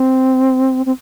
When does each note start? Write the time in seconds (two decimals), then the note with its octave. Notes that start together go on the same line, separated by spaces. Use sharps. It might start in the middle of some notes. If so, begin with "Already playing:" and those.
Already playing: C4
0.86 C4